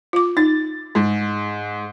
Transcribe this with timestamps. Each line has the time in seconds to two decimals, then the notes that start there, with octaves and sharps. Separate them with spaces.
0.13 F4 D6
0.37 D#4 A6
0.95 G#2